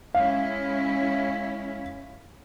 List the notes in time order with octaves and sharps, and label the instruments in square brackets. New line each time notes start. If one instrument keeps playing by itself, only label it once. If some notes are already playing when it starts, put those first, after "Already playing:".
[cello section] G#3 C#4 E4 [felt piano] F5